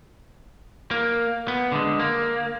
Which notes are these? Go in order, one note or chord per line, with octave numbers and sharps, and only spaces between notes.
A#3
B3
D3 G#3
A#3